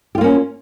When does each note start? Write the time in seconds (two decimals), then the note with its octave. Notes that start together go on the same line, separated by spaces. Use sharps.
0.15 G4
0.18 F4
0.21 A#3
0.24 C#4